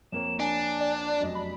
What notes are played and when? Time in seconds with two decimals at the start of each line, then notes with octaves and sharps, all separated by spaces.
0.12 F2 A#3 C#5 E7
0.40 D4 G#5
0.81 D5
1.21 F1 F#2 D#5
1.35 B5